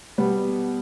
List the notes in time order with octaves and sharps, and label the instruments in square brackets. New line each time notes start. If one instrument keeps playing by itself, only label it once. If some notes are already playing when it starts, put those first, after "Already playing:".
[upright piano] B2 G3 B3